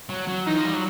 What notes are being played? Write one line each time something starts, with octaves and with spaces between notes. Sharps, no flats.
F#3
F#3
E3 D#4
F3
G3
F#3